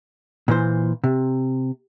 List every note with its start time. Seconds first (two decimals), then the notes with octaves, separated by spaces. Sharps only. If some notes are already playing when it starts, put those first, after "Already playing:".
0.48 A#2 E3 C5
1.04 C3